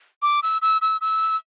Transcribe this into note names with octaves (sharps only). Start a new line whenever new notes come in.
D6
E6
E6
E6
E6